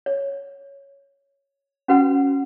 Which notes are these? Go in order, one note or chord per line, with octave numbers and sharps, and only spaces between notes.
C#5
C#4 F#4 B4 F#5